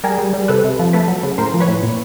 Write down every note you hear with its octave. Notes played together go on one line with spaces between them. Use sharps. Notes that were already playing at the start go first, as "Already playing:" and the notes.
G3 G#4 A#4
G3
G3
C3 A4 B4
C3
F3
A3 A4 B4
F#3
C#3
A2 A#4 C5
F3
B4 C#5
A2
A#2